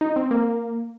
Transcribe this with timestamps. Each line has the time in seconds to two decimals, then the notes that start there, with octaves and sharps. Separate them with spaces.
0.01 D#4
0.16 C4
0.31 A#3